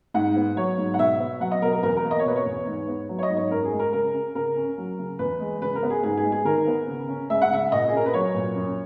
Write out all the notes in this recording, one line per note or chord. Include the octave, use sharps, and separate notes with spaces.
G#2 F#5
B3
F#3 C#5
G#2
F#5
B2 E5
B3
F#3 F#5
D#5
B2 A#4
A#4
E2 A#4
A#4
A#3
D#5
C#5
B2 B4
C#5
E2
G#2
B3
F#3
C#5
D#5
G#2
C#5
F#2 A#4
G#4
G#3
A#4
C#3 A#4
C#4
C#3 A#4
C#4
F#3
C#3
E2 B4
G#3
C#3 B4
A#4
B3
G#4
G#2 G#4
G#4
G#3
G#4
D#3 A#4
B3
C#3
C#4
G#3 E5
F#5
C#3 E5
A#2 D#5
G#4
C#4 A#4
B4
F#3 C#5
A#2
F#2